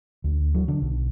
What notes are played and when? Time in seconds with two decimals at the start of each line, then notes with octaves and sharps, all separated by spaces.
0.24 D2
0.55 F#3
0.68 D3
0.82 B1